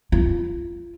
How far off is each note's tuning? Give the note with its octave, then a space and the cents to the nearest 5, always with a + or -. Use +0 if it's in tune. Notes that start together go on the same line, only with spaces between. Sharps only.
F4 -25